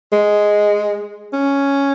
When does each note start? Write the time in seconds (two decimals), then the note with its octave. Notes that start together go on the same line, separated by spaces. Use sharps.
0.12 G#3
1.33 C#4